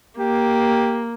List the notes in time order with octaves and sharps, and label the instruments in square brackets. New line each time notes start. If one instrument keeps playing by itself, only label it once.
[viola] A#3 [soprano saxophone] G4